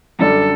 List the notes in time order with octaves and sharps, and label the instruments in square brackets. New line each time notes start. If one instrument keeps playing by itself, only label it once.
[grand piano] F#2 D3 G3 D4 [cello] A4